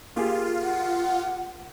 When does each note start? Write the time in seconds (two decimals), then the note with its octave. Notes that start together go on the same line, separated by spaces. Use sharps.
0.16 A#3 F4 G4 G#4
0.62 F#5